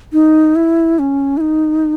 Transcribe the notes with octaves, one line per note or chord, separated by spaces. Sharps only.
D#4
E4
C#4
E4
D#4